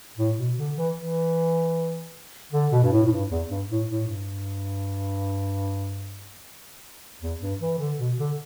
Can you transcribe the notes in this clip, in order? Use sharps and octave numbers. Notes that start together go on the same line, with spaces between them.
A2
B2
D3
E3
E3
D3
B2
G2
A2
A2
G2
E2
G2
A2
A2
G2
E2
G2
E3
D3
B2
D3